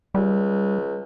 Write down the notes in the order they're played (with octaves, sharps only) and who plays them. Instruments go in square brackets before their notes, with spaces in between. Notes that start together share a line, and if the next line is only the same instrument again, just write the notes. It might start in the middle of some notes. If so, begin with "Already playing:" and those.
[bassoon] C#2 [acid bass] G3